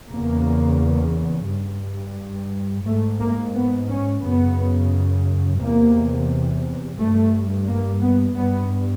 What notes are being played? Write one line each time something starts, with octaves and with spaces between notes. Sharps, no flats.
E2 C#3 A#3
G2
G#2 A3
A#3
B3
C#4
F#2 C#3 B3
E2 C3 A#3
G2 A3
A#3
B3
G2 B3